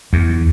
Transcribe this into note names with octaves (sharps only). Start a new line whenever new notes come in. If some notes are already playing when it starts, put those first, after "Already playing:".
E2